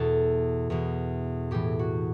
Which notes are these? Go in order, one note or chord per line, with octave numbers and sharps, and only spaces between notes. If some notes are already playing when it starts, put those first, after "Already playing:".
Already playing: E2 B2 A4
E2 B2
A2 E3 G4
F#4